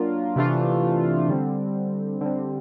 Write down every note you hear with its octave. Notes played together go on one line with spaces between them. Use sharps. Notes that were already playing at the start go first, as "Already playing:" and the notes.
Already playing: F#3 A#3 D4 F4 A#4
C3 E3 A3 D4 F4
D3 G3 C4
D3 G3 C4